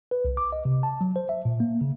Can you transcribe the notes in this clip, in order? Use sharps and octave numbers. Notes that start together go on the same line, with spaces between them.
B4
C2
D6
D#5
C3
A5
F#3
C5
E5
A#2
A#3
C#3